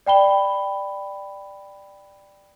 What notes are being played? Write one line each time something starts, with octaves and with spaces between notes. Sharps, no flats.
D5 G5 B5 G7